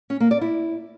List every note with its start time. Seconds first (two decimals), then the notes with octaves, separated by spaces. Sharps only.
0.10 C#4
0.20 A#3
0.31 D5
0.41 E4